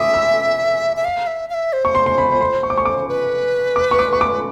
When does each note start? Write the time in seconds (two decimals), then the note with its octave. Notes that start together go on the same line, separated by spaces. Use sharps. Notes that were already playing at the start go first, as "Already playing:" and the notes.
Already playing: E5 D6 D#6
0.14 E6
0.97 E5
1.05 F5
1.27 E5
1.50 F5
1.54 E5
1.73 C5
1.85 C#6
1.95 C6
2.06 C6
2.18 B5
2.32 B5
2.41 C6
2.63 C#6
2.70 D6
2.78 C#6
2.85 D6
3.08 B4
3.76 D6
3.91 C#6
3.99 D6
4.13 C#6
4.21 D6